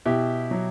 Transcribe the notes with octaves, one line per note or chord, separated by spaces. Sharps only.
B2 E4 G4
F#3